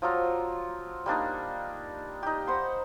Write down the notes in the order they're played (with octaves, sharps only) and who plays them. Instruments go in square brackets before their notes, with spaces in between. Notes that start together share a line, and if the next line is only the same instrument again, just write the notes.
[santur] F3 F#3 F4 A#5
G3 A#3 D4 D#4
D#4 G4
C5 F#5 B5 C6